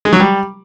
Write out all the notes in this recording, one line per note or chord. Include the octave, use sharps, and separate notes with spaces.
G#3
F#3
G3